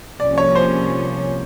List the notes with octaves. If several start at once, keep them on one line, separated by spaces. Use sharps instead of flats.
C2 C3 F3 A#3 C#4 D5
C#5
C5